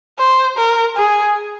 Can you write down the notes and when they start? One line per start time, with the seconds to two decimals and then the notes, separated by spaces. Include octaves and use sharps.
0.19 C5
0.58 A#4
0.96 G#4